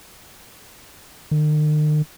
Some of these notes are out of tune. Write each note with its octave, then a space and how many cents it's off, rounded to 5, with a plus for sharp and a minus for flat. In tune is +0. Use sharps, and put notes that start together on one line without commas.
D#3 -45